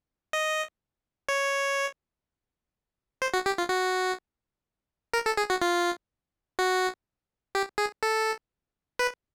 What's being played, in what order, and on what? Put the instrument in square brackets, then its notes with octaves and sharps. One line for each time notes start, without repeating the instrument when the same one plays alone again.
[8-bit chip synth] D#5
C#5
C5
F#4
G4
F4
F#4
A#4
A4
G#4
F#4
F4
F#4
G4
G#4
A4
B4